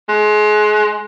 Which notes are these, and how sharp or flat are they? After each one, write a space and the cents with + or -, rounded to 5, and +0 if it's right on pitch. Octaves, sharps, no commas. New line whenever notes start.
G#3 +30